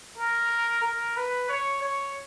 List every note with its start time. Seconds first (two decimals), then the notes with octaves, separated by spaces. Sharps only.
0.18 A#4
0.83 A#4
1.17 B4
1.49 C#5
1.82 C#5